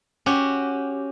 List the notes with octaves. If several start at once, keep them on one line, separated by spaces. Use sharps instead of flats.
C#4 F#4 G4